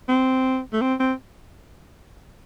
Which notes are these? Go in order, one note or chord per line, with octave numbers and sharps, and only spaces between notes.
C4
A3
C4
C4